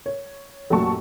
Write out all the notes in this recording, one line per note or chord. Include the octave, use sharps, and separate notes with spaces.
C#5
A1 F#2 A#2 F#4 A5 C#6